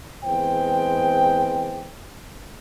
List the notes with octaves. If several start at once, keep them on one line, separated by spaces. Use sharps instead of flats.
E2 G#3 C4 B4 C5 G5